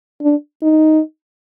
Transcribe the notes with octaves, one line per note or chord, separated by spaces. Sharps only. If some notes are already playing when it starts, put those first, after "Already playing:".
D4
D#4